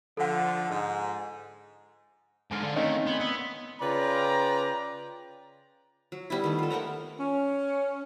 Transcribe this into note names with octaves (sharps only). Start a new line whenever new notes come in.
D3 F3 A4 F#5
G#2
G#2 D3 G#5 C6 F6
D3 D5 F5 G#5
D#3 A3 C4 C#4 D#4 C#5
B3 C6 G#6
B3 D#6 E6
C#3 F4 B4 D5 G5 A#5
F#3
G3 B3 E4
D#3 A3
F4 A4
A3 A#4 F#5 A#5
C#4